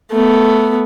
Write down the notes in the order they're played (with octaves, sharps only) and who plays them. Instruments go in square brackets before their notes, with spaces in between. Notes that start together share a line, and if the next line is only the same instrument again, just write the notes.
[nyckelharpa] A3 B3